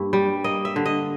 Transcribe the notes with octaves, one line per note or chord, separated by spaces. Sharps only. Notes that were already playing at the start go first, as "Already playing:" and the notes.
Already playing: G2 A#3
G3
A#3 D#5
E5
D3
D#5